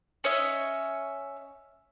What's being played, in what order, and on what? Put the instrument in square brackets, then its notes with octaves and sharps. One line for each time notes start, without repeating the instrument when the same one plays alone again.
[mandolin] C#4 C#5 D#5 E5